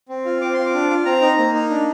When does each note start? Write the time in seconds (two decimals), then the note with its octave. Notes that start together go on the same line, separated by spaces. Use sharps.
0.09 C4
0.25 F4
0.41 C4 D6
0.53 F4 C6
0.66 D6
0.74 D4
0.90 F4
1.05 C4 A#5
1.21 D#4
1.38 A#3
1.54 D#4
1.70 D4